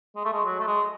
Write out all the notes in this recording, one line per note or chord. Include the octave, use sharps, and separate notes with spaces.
G#3
A3
G#3
F#3
A3
G#3